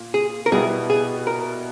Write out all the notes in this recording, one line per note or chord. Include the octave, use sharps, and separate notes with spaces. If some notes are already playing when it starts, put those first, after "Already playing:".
Already playing: A#2
G#4
A#4
B2 G3 B3 E4 G#4
G#4
A#4